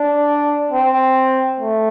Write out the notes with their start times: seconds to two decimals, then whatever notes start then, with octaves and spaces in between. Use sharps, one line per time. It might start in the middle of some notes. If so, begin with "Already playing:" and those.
Already playing: D4
0.71 C4
1.59 A3